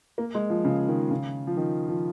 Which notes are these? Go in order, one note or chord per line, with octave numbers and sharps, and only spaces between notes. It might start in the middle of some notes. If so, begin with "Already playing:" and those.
A#3
G#3
F3
C#3
D#3
C#3
F3
D#3
F3